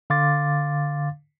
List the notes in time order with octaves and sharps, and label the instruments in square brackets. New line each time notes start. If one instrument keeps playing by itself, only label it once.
[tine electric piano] D3 F5 C6 D6 A6